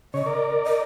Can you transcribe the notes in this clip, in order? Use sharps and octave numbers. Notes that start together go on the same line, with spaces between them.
C#3 C#5 D#5
A#4 D5
D#5